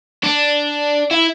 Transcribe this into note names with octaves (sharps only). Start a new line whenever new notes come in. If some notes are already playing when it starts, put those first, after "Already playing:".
D4
E4